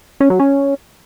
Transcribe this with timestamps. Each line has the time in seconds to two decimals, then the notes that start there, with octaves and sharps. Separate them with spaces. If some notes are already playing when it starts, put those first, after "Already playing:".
0.20 C#4
0.30 F#3
0.40 C#4